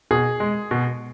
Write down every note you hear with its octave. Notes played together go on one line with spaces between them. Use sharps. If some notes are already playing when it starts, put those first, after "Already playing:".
B2 G#4
G#3
B2